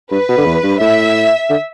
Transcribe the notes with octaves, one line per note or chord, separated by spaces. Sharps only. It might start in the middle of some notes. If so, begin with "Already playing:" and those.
G2 B4
B2
D3
E2
G2
A2 E5
D3